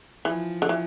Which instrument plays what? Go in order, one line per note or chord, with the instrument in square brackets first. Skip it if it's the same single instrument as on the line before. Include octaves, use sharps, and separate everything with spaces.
[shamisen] E3 [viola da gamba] F3
[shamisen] D3
E3